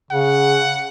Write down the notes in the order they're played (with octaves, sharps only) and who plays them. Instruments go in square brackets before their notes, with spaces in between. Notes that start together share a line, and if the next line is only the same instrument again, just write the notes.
[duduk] C#3 [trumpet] F#5